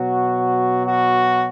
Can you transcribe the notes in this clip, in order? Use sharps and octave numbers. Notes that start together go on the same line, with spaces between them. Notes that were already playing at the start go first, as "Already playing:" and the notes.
Already playing: B2 F#3 F#4
F#4